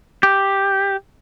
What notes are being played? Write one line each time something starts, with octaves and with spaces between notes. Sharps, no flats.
G4